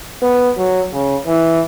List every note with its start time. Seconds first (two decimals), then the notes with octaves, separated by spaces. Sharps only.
0.22 B3
0.58 F#3
0.93 C#3
1.27 E3